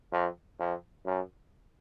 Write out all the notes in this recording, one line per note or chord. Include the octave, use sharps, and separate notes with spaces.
F2
F2
F#2